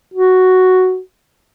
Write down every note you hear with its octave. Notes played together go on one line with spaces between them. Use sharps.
F#4